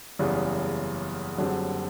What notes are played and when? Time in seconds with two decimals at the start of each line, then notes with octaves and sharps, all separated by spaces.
0.19 F#1 E2 C#3 E3 G3
1.38 F#1 F#2 D3 G3 C4